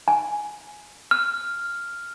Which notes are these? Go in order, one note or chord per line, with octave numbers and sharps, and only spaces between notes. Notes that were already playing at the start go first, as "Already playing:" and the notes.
G#5
F6